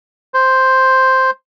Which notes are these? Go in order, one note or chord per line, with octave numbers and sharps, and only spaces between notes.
C5